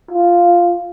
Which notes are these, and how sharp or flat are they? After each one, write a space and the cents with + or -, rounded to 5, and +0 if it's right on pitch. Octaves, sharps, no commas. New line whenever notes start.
F4 +0